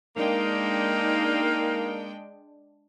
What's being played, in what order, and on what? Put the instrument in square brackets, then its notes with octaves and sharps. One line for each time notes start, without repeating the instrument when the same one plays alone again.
[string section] G#3 D4 G5 [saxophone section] A#3 D#4